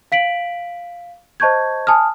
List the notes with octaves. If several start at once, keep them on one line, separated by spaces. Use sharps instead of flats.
F5 B6 D7 F#7
C5 D#5 A5 C#6 G6 G#6
G#5 A5 D#6 F6